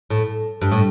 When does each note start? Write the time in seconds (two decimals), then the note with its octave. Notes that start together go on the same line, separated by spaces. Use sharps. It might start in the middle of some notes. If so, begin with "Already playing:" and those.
0.10 A2
0.62 G2
0.71 A2